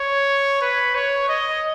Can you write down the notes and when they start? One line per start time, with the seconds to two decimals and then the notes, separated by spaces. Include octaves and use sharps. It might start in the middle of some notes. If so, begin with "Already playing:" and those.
Already playing: C#5
0.62 B4
0.95 C#5
1.29 D#5